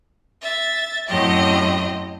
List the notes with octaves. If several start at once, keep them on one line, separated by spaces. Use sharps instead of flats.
E5 A6
F#2 A2 F#3 C4 G4 D#5